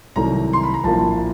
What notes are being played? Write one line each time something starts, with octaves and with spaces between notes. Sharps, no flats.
C2 C3 D#3 F#3 A3 A#5
C6
B5
A#5
A#1 A2 F3 A#3 A5